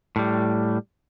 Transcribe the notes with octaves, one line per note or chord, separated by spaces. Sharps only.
A2 G3